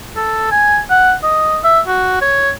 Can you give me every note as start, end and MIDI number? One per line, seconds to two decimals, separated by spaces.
0.16 0.47 69
0.51 0.79 80
0.90 1.13 78
1.23 1.58 75
1.64 1.80 76
1.87 2.21 66
2.21 2.51 73